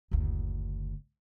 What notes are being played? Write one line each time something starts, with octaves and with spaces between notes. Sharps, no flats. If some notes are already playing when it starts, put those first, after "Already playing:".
F#1 D2